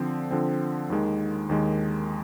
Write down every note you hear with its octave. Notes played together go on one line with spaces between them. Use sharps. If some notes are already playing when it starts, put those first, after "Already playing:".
Already playing: D3 F3 C4
D3 F3 C4
D#2 D#3 G#3
D#2 D#3 G#3